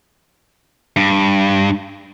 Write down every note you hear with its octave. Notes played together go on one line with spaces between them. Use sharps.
G2